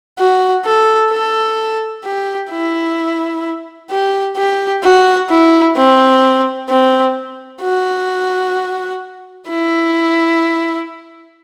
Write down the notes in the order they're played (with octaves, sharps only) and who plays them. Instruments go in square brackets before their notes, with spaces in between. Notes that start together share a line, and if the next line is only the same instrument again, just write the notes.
[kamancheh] F#4
A4
A4
G4
E4
G4
G4
F#4
E4
C4
C4
F#4
E4